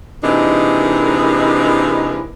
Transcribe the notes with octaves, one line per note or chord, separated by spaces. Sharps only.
C3 E3 G#3 A#3 D4 D#4